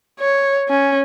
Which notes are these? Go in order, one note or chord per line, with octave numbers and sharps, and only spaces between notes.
C#5
C#4